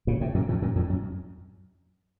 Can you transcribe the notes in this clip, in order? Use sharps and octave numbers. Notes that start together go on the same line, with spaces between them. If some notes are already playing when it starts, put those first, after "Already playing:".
A#2 C#3
A2 C3
F#2 A#2
F2 A2
F#2 A#2
F2 A2
F#2